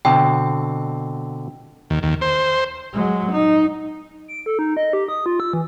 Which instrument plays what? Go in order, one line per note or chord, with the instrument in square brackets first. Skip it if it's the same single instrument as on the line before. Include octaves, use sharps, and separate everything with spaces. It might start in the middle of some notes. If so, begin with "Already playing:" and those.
[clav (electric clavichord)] B2 D3 C4 [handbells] G5
[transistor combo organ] D#2
D#2
C5
[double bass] F#3 G#3
D#4
[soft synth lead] D7
A4
D#4
D#5
G4
D#6
F4
E6
E3